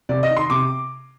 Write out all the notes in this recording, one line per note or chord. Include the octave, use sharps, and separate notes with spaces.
C3 D5
D#5
D#3
C6
C3 D6